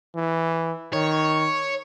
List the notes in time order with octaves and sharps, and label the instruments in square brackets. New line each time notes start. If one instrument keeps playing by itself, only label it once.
[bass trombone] E3
[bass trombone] D#3 [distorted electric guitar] C#5